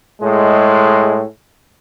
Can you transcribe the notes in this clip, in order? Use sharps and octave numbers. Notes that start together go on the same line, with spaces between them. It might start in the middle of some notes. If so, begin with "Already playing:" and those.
A2 G#3